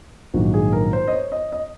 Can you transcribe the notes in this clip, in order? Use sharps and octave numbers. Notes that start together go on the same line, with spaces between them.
A#1 G#2 D#3 F#3 F#4
G#4
A#4
C5
D#5
C#5
D#5
D#5